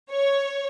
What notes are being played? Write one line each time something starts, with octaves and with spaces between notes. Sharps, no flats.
C#5